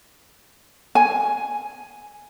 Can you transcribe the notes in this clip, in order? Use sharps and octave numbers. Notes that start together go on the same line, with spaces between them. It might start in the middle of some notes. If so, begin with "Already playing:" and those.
G#5